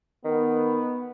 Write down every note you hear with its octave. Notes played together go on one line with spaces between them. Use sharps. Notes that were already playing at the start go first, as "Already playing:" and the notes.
D#3 B3